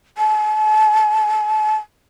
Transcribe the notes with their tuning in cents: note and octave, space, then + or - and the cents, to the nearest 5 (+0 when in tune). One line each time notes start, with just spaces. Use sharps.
A5 -40